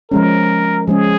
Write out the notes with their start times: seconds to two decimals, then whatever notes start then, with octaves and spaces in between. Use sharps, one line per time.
0.11 F3 G#3 C#4 A#4
0.87 F3 G#3 C#4 G#4